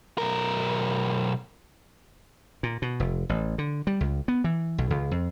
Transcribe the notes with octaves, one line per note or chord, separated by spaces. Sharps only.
B1 A#4
A#2
B2
F1
A1
D3
G3
C#2
B3
E3
B1
C#2
F2